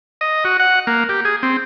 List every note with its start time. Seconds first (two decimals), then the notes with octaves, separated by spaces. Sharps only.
0.21 D#5
0.45 F#4
0.60 F#5
0.87 A#3
1.09 G4
1.25 G#4
1.43 C4